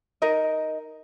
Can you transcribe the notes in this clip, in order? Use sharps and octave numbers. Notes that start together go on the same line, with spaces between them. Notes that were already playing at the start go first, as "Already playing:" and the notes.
D#4 A#4 D#5